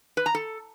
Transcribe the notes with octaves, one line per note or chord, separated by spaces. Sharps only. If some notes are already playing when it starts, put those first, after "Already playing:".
B4
A#5
A4